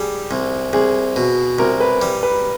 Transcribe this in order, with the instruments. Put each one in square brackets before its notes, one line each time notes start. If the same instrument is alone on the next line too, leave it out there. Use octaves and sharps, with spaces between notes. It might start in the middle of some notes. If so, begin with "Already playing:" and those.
Already playing: [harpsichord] G3 [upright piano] G#4
[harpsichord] C2
[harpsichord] C2 [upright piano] G#4
[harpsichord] B2
[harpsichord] C2 [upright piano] A#4
[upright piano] B4
[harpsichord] G3
[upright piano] B4